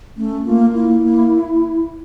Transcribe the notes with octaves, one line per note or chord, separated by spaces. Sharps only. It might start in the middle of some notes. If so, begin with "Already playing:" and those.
A3 C#4
A#3 F4
A#3 E4
A#3